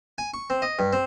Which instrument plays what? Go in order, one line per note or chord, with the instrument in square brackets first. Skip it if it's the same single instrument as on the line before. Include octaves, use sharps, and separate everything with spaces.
[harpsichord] G#5
C#6
C4
D#5
G2
C4